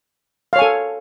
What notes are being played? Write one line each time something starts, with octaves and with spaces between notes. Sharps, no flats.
A4 C#5 F5 G#5